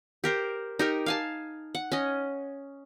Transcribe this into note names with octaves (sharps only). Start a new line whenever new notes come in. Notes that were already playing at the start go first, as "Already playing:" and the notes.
G4 A#4 C5
D#4 G4 A#4
F5 G#5 A5
F#5
C#4 D#5